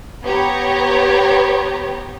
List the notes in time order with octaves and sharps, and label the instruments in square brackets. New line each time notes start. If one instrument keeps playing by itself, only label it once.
[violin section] B3 G4 C#5 A#5